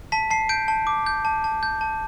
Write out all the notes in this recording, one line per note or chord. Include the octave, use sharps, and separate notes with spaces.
A5 B6
A5 C7
G6 D7
A5
D6
G6
A5
A5
G6
A5